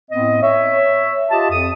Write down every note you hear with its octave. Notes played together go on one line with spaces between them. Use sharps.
A2 B3 C4 D#5
C#5 E5
F4 G4 D#5 A5
F2 D#6